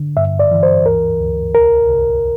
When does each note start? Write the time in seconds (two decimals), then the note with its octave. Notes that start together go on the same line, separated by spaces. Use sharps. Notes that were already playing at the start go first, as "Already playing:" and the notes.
Already playing: D3
0.17 G2 E5
0.39 D5
0.51 E3
0.63 C5
0.85 D2 A#4
1.20 D2
1.54 C2 A#4
1.90 C2